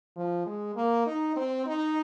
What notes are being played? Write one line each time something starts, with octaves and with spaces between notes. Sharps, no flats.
F3
G#3
A#3
D#4
C4
D#4